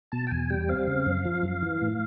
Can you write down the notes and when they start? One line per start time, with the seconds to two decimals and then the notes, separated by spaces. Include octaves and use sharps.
0.12 B2 A5
0.27 G5
0.31 E2 G#5
0.50 G3 G5
0.69 C4 F5
0.87 C#3
1.06 F#2
1.25 F3
1.43 F#2
1.62 E3
1.82 A2